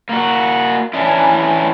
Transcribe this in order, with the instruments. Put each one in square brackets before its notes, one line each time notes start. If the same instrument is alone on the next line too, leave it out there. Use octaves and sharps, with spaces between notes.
[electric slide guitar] A#3 F#4
E3 C#4 D4 E4